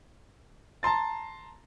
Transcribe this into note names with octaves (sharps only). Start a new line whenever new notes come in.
A5 A#5 C6 A6